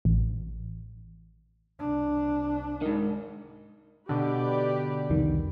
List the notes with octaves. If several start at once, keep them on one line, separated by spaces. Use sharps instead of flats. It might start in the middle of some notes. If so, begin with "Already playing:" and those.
A1
C2 D4
G#2 D#3
B2 D3 G4 B4 D5
C2 F2 D#3